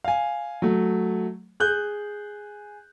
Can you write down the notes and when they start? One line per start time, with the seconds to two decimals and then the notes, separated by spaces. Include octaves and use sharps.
0.04 F5 G#5
0.62 F#3 A3
1.60 G#4 F#6 G6